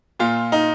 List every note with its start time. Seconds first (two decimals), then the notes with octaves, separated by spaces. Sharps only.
0.19 A#2 F4
0.52 D#4